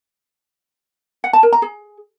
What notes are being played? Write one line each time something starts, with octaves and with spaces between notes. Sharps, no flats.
F#5
A5
A#4
A#5
G#4